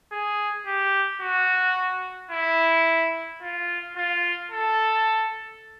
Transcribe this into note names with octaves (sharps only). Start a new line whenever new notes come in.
G#4
G4
F#4
E4
F4
F4
A4